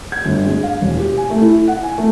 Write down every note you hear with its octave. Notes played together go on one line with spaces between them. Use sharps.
G#6
G1
G#3
F5
E1
G4
G#5
A3
E4
F#5
G#5
A3